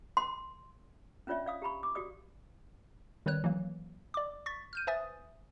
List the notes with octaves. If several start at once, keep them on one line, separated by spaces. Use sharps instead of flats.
C6
C#4 D4 F4 C#5 D5 E5
D5 F5 D#6
G4 A#5 B5 C#6
D6
F#4 G4 D5 D#6
D#3 G3 C4 B4 C#5 F#6
E3 F#3 A#3
D5 D6
C#6 A6 B6
F6 G6 D#7
B4 C5 E5 G#5 D#6 A6